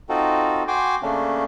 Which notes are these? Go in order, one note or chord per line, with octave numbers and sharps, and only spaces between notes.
C4 D#4 F4 F#4 A4
F#4 G5 G#5 C6 D6
C#3 A3 A#3 C#4 D4